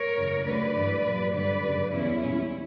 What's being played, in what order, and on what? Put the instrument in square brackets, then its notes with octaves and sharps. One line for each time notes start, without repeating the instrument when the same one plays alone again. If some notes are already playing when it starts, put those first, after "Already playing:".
Already playing: [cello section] A#4 C#5
F#2 C#3 E3 G3
D2 D3 G3 B4 D5
G2 E3 G3
A#2 F#3
G2 D3 G3 B4 D5
F#2 C#3 G3
E2 C#3 E3 C#4 E4
A#2 G3